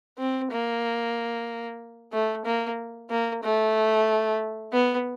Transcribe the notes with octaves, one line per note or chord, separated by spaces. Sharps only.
C4
A#3
A3
A#3
A#3
A3
B3